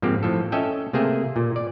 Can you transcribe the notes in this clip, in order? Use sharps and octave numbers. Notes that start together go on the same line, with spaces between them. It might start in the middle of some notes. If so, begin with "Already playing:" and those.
G#2 F3 A#3 C4 G4
A2 F3 A4
C#4 A4 D#5 E5 G5
C3 A3 A#3 G#4 E5 G5
A#2
D5